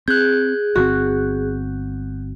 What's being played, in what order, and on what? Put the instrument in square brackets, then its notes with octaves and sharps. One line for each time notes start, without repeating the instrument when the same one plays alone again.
[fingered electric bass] C4 [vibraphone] G#4 [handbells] F#6 G6
[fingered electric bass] G1 D3 C4 [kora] F#4